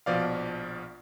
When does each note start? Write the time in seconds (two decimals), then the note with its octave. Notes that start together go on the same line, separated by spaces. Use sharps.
0.06 A#1 B2 F3 D5 F5